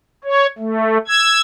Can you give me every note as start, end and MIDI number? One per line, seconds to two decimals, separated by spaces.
0.24 0.46 73
0.58 0.98 57
1.08 1.41 88
1.08 1.41 92